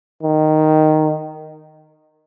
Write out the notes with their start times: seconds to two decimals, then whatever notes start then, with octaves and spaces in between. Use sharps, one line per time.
0.23 D#3